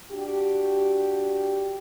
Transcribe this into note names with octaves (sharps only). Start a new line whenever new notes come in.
D4 F#4 G4